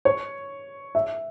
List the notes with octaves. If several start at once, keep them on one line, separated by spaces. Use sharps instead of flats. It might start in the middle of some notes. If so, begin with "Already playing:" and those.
C#5
E5